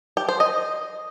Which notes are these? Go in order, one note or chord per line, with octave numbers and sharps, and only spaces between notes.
G4
C5
D#5